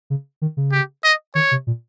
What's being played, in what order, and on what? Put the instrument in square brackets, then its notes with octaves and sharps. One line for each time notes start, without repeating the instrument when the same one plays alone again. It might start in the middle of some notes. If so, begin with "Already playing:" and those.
[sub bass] C#3
D#3
C#3
[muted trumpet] G4
D#5
[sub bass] D#3 [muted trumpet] C#5
[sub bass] C3
A#2